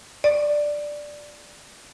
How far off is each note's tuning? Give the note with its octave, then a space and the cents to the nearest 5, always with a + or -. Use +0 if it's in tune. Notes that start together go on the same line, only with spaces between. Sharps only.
D5 +5